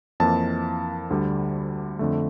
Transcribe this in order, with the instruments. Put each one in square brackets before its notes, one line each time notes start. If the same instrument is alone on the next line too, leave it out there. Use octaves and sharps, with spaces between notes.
[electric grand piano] F2 E3 A#3 A5
D2 D3 G3
F2 D3 A3